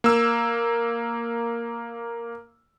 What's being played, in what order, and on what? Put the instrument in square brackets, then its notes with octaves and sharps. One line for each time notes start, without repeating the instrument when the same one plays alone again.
[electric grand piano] A#3 E6